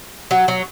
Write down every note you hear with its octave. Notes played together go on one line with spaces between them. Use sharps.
F#3
F#3